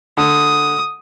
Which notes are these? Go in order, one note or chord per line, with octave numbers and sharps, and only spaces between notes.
D3 D#6